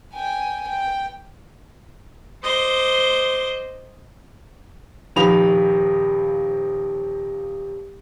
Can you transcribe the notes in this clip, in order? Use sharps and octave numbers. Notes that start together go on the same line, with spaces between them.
G5 G#5
G5
C5 D#5 C6 D6
D#1 F3 D#4 B5 F7